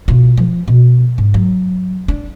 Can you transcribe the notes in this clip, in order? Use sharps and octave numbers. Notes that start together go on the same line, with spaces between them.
B2 F4
F3
B2
G#2
F#3
D4